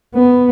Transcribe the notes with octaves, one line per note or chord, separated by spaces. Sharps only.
B3